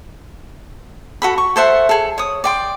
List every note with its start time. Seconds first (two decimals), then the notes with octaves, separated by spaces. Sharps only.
1.22 F#4 A4 B5
1.38 C#6
1.56 A4 C5 E5 F#5
1.89 G#4 A4
2.18 C#5 D#6
2.44 D5 G5 C6